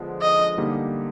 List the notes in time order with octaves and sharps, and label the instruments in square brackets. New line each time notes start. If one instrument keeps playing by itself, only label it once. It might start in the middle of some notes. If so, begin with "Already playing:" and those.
Already playing: [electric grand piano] D3 F3 G#3 B3
[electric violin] D#5
[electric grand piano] D3 G3 A#3 D#4